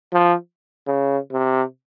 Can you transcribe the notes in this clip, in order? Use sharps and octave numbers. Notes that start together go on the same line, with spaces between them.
F3
C#3
C3